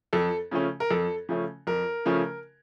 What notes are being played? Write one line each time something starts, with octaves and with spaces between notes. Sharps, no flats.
F2 A4
C#3 F3 A3 C#4
A#4
F2 A4
C#3 F3 A3 C#4
F2 A#4
C#3 F3 A3 C#4